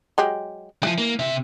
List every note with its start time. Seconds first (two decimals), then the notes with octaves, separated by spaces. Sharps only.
0.18 F#3 G#3 G4
0.83 E3 F3 G3
0.98 A#3
1.19 C3 E5